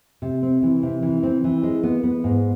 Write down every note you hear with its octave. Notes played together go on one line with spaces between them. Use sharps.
C3
C4
E3
C3
E3
C4
E3
G#3
B3
B3
G#2